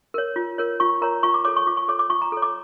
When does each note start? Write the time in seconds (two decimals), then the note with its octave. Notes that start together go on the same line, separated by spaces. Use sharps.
0.14 A#4 C#5
0.36 F4
0.58 A#4 C#5
0.80 F4 C#6
1.02 A#4 C#5 A#5
1.23 F4 C#6
1.34 D6
1.45 A4 C#5 D6
1.56 C#6
1.67 F4 D6
1.77 C#6
1.88 A4 C#5 D6
1.99 D6
2.10 F4 C#6
2.22 A#5
2.32 A4 C#5
2.42 D6